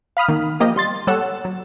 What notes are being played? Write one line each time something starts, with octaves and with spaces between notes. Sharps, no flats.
F5 B5 D#6 F6
D#3 A#3
F3 A#3 G4 D#5
G3 C6 A6
G3 A4 C#5 F#5 E6
F#3